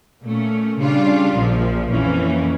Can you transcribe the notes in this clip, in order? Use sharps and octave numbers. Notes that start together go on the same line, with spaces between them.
A#2 A3 C#4
C#3 G3 D4 F4
A#1 A#2 F3
F2 E3 A#3 C#4